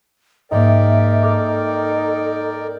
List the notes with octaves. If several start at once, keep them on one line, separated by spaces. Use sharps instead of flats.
G#2 A#3 D#4 A#4 D5 E5 G5
A4 D6 F6 A6